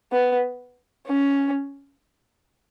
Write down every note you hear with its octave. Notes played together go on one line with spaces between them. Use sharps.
B3
C#4